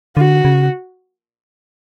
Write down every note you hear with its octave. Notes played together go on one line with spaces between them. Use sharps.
D3 F#4
C#3